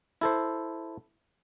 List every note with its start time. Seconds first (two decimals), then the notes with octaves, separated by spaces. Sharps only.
0.21 E4 A4 C5